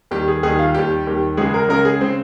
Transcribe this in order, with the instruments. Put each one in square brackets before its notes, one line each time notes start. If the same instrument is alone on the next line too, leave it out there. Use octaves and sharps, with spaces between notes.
[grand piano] D#2 D#3 G3 G4
G#4
D#2 D#3 G3 G#4
F4
D#2 D#3 G3 G4
D#2 D#3 G3
C#2 C#3 G#3 G#4
A#4
C#2 C#3 G#3 A#4
G#4
C#3 G#3 C4